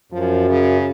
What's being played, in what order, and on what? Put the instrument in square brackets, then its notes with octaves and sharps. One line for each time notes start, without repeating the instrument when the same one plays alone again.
[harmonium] F#2 [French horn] F3
[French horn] C#3